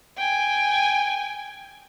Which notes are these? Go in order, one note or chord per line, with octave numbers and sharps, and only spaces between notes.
G5 G#5